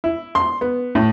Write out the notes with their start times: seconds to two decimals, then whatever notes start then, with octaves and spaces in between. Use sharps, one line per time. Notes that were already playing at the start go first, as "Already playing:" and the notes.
0.04 E4
0.35 C6
0.61 B3
0.95 A2